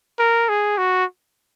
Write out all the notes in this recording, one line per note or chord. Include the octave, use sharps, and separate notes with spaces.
A#4
G#4
F#4